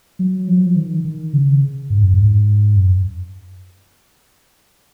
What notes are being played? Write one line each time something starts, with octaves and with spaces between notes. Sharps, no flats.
F#3
F3
F#3
F3
D#3
D#3
C#3
G#2
F#2
G#2
F#2